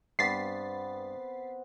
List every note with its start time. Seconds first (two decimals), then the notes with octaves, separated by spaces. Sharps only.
0.19 G2 B3 C4 A6 B6 C7